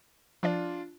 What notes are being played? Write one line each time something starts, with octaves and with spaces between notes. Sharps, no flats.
F3 D4 F4 D5 A5